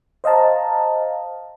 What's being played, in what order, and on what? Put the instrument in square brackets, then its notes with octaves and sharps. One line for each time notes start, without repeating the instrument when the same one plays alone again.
[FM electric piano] C5 D#5 F5 A5 A#5